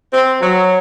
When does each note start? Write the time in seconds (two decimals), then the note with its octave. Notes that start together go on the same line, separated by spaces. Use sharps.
0.13 C4
0.40 F#3